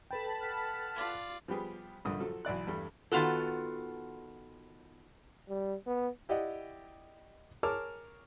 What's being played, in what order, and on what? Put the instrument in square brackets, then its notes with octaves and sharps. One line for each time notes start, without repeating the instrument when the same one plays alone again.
[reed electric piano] A4 B4 G5 [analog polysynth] A5 B5 B6
[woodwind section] F#5 F6
[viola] F4 D5
[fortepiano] F3 G3 B3 G4 G#4
A#1 G2 D3 F3 D#6
F3 F#3 A4
B1 E3 D5 F#6
E2 G2 G3 A3
[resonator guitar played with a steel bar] D#3 B3 F4 F#4 A4
[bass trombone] G3
B3
[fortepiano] E4 G4 D5 D#5 F#5
G#4 A#4 C#5 A5 D6 F6